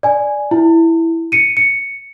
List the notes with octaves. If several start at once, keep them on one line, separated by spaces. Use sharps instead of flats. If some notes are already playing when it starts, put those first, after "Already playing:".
D5 G#5
E4
C#7 D#7
C#7